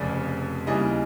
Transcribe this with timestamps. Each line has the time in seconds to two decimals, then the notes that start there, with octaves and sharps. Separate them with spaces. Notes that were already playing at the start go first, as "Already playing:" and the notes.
Already playing: F1 F2 C#3 D5
0.67 D#2 C#3 E3 G3 D#5